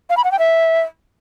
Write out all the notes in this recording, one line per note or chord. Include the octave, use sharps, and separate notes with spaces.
F5
B5
F#5
G5
E5